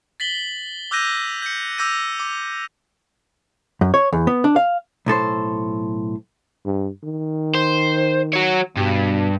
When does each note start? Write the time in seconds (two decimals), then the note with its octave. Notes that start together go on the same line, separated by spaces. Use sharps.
0.20 A6 B6 F#7 G7
0.91 D6 E6 F#6 G6 A#6 D#7
1.42 G6 C#7
1.78 D6 E6 G6 A#6 D#7
2.20 D6
3.81 F#2
3.94 C#5
4.13 E2
4.27 B3
4.44 D4
4.56 F5
5.06 B1 A2 A4 C5
6.65 G2
7.04 D#3
7.55 C5
8.33 F#4 C#5
8.77 G2 B2